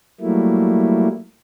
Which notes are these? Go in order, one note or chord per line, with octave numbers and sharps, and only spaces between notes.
F#3 G3 A3 A#3 E4